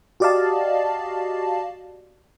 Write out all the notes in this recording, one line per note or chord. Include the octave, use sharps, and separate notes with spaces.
F#4 G4 D5 D#5 F5 A5